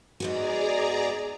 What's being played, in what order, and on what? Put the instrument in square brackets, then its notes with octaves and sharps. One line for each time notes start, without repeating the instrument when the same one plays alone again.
[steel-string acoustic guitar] G#2 B3 F#4 [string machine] G#4 D5 A#5